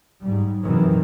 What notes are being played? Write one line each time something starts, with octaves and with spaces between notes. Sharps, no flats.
G#2 G3
F#2 C3 D#3 E3 F#3